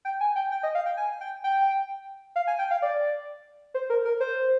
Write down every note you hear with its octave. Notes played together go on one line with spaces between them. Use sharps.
G5
G#5
G5
G5
D#5
F5
G5
G#5
G5
G5
F5
G#5
G5
F5
D5
C5
A#4
A#4
C5